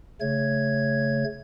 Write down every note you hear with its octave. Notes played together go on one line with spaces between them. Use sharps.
C#3 A3 C#5 G#6